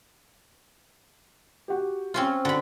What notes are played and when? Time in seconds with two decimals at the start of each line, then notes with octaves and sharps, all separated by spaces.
1.68 F#4 G4
2.14 C4 C#4 F4
2.45 D3 F#4 B5